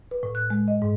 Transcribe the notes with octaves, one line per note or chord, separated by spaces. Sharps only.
B4
A2
F#6
G#3
D#5
G#2